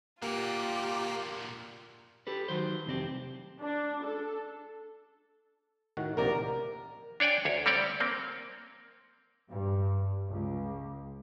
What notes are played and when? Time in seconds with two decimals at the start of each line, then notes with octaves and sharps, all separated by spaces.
0.22 A#2 D3 A#3 F4 G4
2.27 G4 A4 B4
2.48 D#3 F#3 C5
2.86 C2 F2 C4 G4
3.60 D4
4.02 A4
5.97 A2 D#3 F#4
6.17 A#1 C3 A#4 D5
7.20 D4 C#5 D5 G5 G#5
7.45 D2 C#5
7.66 G3 C4 G4 C#5 D5 G5
8.00 A#3 C4
9.50 G2
10.29 C#2